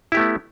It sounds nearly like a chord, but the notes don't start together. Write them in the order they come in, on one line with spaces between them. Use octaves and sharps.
E4 G4 A3 B3